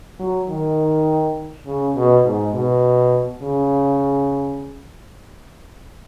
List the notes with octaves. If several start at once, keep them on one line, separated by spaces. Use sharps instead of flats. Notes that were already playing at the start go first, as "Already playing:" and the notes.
F#3
D#3
C#3
B2
G#2
B2
C#3